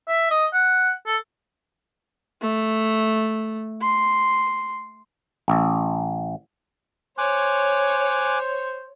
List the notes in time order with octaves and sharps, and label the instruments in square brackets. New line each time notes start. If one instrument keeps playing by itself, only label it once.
[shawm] E5
D#5
F#5
A4
[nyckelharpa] A3
C6
[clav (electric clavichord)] A1
[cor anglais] C5 [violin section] C#5 [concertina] G#5 D6 F#6